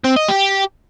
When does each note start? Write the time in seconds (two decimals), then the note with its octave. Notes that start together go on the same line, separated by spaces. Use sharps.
0.05 C4
0.17 D#5
0.29 G4